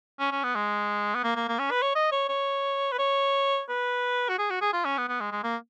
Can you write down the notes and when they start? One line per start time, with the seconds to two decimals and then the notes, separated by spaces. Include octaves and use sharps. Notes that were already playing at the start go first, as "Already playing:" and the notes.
0.20 C#4
0.32 C#4
0.44 B3
0.56 G#3
1.15 B3
1.24 A#3
1.36 A#3
1.49 A#3
1.59 C#4
1.71 B4
1.83 C#5
1.95 D#5
2.12 C#5
2.29 C#5
2.92 B4
2.99 C#5
3.69 B4
4.29 F#4
4.39 G#4
4.51 F#4
4.62 G#4
4.73 F4
4.85 C#4
4.98 B3
5.09 B3
5.21 G#3
5.32 G#3
5.44 A#3